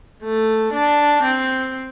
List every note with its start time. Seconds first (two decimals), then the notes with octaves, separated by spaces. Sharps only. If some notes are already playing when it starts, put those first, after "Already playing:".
0.23 A3
0.73 D4
1.23 C4